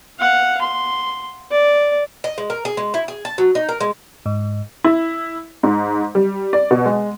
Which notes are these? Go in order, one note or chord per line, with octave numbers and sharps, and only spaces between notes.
F5 F#5
C6
D5
D#5
G#3
A#4
G#4
G#3
E4
G#4
A5
F#3
D#4
A#4
G#3
G#2
E4
G#2
G3
D5
B2
G#3